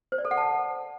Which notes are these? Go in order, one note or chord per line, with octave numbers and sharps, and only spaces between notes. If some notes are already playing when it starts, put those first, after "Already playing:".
C5
D5
A4
F#5
A5